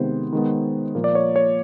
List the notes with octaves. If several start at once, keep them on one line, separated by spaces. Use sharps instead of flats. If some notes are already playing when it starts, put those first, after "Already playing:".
Already playing: C3 D#3 G#3 B3 C5
D#3 G#3 B3
A#2 F3 A#3
D5
C#5
C#5